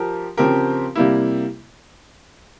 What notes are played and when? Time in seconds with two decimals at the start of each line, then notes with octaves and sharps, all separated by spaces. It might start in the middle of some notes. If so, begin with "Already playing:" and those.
Already playing: F3 G4 A#4
0.37 C#3 F3 C4 G4 A#4
0.96 C3 G3 A#3 E4